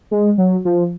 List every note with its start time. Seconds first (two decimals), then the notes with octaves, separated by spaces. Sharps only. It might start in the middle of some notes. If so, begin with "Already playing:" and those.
0.11 G#3
0.38 F#3
0.65 F3